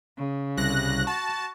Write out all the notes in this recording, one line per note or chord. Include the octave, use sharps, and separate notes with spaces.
C#3
C2 F#6 A#6
F#4 A5